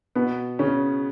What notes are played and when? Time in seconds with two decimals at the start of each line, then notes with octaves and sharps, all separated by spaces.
0.15 B2 B3
0.59 C#3 C#4